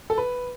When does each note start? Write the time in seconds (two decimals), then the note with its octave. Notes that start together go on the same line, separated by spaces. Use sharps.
0.10 A4
0.18 B4